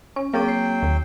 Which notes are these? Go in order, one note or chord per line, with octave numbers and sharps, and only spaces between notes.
C#4 C#6
F#3 A#3 C4 G#4 G5 D6
C7
D#2